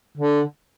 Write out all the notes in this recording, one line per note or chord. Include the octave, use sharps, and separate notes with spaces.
D3